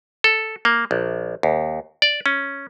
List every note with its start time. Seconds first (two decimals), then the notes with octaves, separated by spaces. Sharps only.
0.24 A4
0.65 A#3
0.91 A#1
1.43 D#2
2.02 D5
2.26 C#4